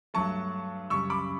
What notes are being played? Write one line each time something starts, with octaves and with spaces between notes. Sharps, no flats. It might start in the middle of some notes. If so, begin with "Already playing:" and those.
G2 F#3 A3 A5 C#6
F#2 C#3 G3 C#6 E6
B5 D6